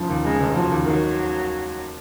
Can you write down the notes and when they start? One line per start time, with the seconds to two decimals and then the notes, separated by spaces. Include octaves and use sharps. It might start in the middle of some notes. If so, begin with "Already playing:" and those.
Already playing: F1 C#3 F3
0.10 D#2
0.24 C#3 G#3
0.40 F1
0.55 F3 F#3
0.71 D#2
0.86 D#3 F#3